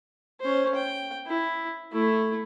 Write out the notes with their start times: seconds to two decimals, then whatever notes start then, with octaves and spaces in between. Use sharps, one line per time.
0.40 C#4 C5
0.75 G5
1.26 E4
1.92 A3 E4